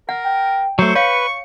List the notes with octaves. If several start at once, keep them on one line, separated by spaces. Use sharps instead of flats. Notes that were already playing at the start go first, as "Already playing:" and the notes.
A#4 F#5
G5
F#3 A3 C5 C#7
B4 C#5 F5 C#6